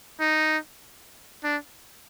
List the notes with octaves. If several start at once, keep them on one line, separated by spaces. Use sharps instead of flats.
D#4
D4